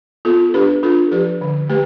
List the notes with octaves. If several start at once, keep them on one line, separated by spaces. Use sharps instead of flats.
B3 F4 A4
D4 G4 B4
D4 F4 A4
F3 G4 B4
D3
A3 G4 B4